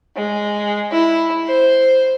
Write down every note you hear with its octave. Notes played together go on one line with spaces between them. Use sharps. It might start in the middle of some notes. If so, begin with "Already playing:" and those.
G#3
E4
C5